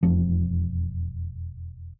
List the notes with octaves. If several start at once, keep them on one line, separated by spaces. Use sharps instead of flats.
E1 F2 F3